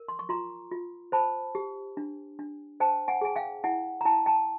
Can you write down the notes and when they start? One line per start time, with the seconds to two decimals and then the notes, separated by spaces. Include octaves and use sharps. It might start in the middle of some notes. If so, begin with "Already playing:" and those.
Already playing: A#4
0.08 C6
0.19 C#6
0.29 F4 A#5 C6
0.71 F4
1.12 C5 A5 B5
1.55 G4
1.97 D4
2.39 D4
2.80 C5 G5 A5
3.08 F#5 G#5
3.21 G#4 G#5
3.36 F5 G5
3.64 E4 F#5 G#5
4.01 A#5
4.05 E4 G5 A5
4.26 G5 A5